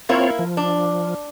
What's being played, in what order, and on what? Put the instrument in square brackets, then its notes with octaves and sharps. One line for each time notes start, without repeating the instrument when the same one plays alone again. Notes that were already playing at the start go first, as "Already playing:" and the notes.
[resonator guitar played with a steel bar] A#3 E4 [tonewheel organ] C4 F4 C#5
[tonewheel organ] F3
[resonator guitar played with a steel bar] D4